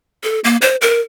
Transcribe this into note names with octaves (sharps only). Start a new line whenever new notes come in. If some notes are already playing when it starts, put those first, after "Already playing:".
A4
A#3
C5
A#4